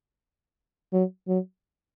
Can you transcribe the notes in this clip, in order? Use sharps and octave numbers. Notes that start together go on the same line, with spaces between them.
F#3
F#3